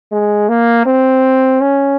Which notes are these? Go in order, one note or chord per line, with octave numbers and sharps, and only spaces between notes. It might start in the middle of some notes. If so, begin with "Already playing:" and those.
G#3
A#3
C4
C#4